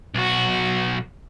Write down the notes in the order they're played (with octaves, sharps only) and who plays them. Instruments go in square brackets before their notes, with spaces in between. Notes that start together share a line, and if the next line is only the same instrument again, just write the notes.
[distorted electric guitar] B1 F#4